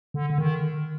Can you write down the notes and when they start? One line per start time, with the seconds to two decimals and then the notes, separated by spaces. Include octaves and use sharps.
0.14 D3
0.30 D3
0.38 D#3